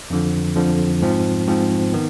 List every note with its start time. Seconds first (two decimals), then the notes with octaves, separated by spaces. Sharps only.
0.10 F2 D3 F3
0.56 F2 D3 F3
1.02 G#2 F3 C4
1.48 G#2 F3 C4
1.93 D#3 B3